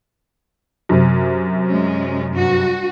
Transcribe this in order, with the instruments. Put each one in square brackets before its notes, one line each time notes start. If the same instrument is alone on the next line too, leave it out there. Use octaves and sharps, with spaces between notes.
[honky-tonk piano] F#2 C3
[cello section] G#3 C#4
G2 F#4